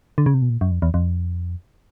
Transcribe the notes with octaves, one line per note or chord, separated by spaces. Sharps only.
D3
C#3
C3
B2
A#2
F#2
F2
E2
F2